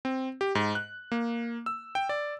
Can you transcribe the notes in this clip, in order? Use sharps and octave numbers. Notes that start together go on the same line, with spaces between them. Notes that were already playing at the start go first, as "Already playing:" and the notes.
C4
G4
G#2
F#6
A#3
E6
G5
D5